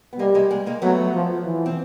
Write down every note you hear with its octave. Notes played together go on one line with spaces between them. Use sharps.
B3
G3 G#3 A#3
G#3 A#3
G#3 A#3
G#3 A#3
F#3 A3 B3
F3
E3
C4